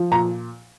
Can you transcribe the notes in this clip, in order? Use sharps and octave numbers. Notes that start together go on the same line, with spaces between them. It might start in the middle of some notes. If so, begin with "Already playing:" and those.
Already playing: F3
A#2 A#5